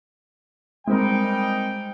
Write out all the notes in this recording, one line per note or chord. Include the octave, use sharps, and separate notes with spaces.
G3 G#3 C4 D#4 A#4 G5